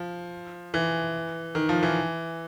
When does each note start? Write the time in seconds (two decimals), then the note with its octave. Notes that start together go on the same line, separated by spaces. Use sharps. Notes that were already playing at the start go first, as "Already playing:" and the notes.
Already playing: F3
0.74 E3
1.55 D#3
1.69 F3
1.83 E3